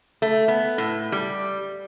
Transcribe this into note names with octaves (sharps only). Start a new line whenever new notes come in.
A3
B3
A2
G3